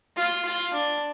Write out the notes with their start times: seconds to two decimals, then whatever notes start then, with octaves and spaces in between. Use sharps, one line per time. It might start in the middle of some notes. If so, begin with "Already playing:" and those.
0.16 F4
0.45 F4
0.73 D4